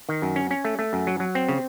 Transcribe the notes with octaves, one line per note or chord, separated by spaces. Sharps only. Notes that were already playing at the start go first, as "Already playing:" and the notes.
D#3
F#2
C#4
C#4
A3
A3
F#2
F#3
F#3
C4
C#3